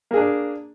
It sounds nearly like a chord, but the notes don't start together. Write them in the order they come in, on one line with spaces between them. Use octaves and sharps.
A#3 G#4 D4